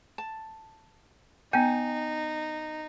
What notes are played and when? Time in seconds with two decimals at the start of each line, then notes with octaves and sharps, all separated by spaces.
0.18 A5
1.53 B3 D#4 G5 G#5 G6